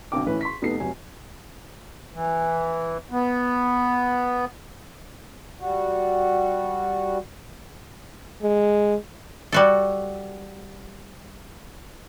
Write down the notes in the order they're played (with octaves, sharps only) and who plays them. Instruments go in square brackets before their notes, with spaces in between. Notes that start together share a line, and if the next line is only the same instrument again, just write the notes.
[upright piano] B1 F2 D3 G5 D6
A2 E3 C#4 B4
C6 C#6 B6
F1 B3 D#4 A4 C7
F1 C3 F#3 G#5
[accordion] E3
B3
[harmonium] G3 F#4
[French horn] G#3
[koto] G3 F#4 A4